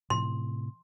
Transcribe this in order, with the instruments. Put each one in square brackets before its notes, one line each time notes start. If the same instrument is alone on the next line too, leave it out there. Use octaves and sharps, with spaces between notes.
[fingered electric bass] A2 C3 [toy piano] C6